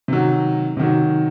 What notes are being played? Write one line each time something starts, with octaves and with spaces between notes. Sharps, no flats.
C3 D#3 F#3
C3 D#3 F#3